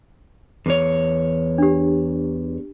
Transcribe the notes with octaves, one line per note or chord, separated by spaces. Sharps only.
E2 C#5
D4 G4